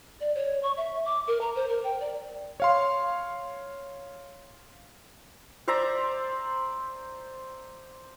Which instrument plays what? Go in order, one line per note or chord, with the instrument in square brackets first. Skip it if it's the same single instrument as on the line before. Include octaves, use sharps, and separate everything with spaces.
[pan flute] D5
C#5
C#6
E5
D6
A#4
A#5
C5
A#4
G5
D5
[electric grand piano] C#5 F5 C6
[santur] C5 D5 E5 A#5